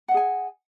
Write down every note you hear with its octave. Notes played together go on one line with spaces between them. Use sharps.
G#4 D#5 F#5 G#5